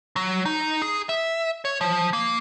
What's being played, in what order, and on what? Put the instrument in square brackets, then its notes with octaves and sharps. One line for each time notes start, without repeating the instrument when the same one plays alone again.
[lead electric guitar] F#3
D#4
G#4
E5
C#5
F3
A#3